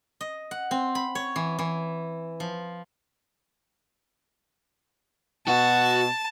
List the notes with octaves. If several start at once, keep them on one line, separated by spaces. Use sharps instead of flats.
D#5
F#5
C4
B5
C#5
E3
E3
F3
B2 F#4 A5